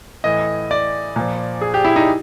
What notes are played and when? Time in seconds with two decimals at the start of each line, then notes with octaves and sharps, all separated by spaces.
0.24 A2 E3 D#5
0.71 D5
1.16 A#2 F3
1.61 G#4
1.74 G4
1.85 E4
1.96 D#4